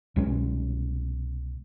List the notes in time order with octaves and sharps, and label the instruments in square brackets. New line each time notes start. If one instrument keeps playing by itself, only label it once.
[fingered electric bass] C2 B2 G#3 C#4